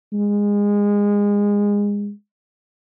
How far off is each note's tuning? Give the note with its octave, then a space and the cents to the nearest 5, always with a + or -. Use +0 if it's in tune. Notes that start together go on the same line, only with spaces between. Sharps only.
G#3 -25